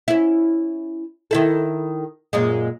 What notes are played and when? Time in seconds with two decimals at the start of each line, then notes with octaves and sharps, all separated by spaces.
0.08 C#4 E4
1.31 D#3 E4 A4
2.33 F#2 A#2 G#3